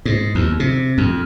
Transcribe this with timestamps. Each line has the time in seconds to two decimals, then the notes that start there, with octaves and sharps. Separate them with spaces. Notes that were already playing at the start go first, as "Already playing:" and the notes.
0.05 G#2
0.35 D#2
0.60 C3
0.98 F2